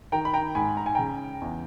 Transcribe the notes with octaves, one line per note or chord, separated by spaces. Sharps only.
D#3 G5 A#5
B5
G5 A#5
G#2 G#5 B5
A#5
G#5
C#3 G5 A#5
E2